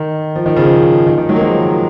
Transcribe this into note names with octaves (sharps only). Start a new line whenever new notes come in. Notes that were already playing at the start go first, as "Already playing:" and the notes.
Already playing: D#3
F3
D#3
C#3 F3
D#3
D#3
D#3 F#3
A#3
F3 G#3